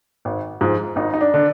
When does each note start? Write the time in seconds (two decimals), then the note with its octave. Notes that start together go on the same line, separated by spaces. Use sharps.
0.25 G#1
0.61 G#2 F3
0.96 G#1 D#4
1.14 D#4
1.21 D4
1.34 D3